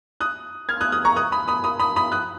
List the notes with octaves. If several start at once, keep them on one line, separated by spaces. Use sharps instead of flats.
D#6 F#6
F6 G#6
D#6 F#6
D#6 F#6
A#5 C#6
D#6 F#6
B5 D#6
B5 D#6
B5 D#6
B5 D#6
B5 D#6
D#6 F#6